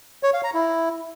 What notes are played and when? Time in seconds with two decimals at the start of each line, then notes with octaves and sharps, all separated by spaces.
0.23 C#5
0.34 F5
0.44 A#5
0.54 E4